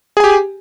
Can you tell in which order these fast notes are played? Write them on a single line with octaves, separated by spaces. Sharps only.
G#4 G#5 G4